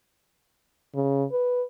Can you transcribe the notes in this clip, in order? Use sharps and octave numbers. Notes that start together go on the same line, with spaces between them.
C#3
B4